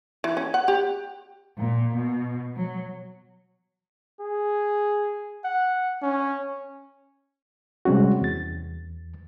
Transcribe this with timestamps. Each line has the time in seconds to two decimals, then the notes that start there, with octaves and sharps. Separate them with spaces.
0.24 E3
0.37 C#4
0.54 F#5
0.68 G4
1.59 A#2
1.95 B2
2.56 F#3
4.20 G#4
5.45 F#5
6.02 C#4
7.85 C3 G3 G#3 C#4 F#4
8.21 E2 A6